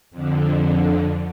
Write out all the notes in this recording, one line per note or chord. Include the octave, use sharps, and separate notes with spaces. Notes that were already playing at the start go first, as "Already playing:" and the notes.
F2 D3